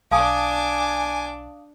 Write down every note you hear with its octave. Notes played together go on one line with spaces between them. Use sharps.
B1 D4 F5 G#5 A5 D6 D#6